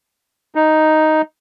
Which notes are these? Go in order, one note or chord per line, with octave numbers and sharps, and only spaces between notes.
D#4